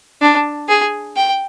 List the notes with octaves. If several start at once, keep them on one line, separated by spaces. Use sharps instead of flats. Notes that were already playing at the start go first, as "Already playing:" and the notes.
D4
G#4
G5